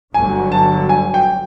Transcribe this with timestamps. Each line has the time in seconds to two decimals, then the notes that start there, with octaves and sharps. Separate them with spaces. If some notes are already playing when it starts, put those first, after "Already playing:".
0.14 G1 G2 D3 F#3 G#5
0.52 A5
0.89 G#5
1.14 G5